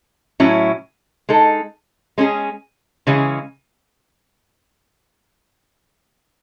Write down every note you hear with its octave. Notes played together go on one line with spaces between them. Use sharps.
A2 F#3 C#4 E4
G#3 D#4 A4
G#3 C#4 G#4
C#3 E3 G#3 C#4 G#4